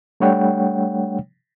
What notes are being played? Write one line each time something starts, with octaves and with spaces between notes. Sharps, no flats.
G3 A3 D4 C#5 F#5 G5